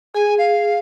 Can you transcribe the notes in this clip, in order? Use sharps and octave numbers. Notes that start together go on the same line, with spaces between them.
G#4 G#5
F5